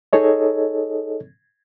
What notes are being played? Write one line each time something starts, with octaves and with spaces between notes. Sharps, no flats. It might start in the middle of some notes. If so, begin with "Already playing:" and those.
D#4 G#4 A4 C#5 D#5